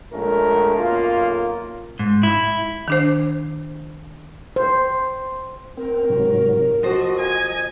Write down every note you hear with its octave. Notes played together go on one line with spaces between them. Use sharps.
A#1 G#3 A3 C#4 A#4
B1 F#2 A#3 F4
G#2
E4
D#3 D4 C5
C5
C4 A#4
G#2 C3 F#3
F3 F#4 C5 D#5
G#5